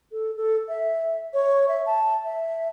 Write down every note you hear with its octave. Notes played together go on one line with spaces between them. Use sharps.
A4
A4
E5
C#5
E5
A5
E5